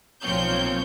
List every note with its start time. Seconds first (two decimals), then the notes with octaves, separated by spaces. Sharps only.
0.23 B1 A#2 F3 C4 C#5 G6